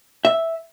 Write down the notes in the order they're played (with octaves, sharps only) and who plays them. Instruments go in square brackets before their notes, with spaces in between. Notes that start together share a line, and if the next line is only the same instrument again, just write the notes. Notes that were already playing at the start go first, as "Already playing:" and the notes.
[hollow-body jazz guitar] E5